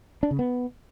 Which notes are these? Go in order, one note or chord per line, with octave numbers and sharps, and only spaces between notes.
D4
C#3
B3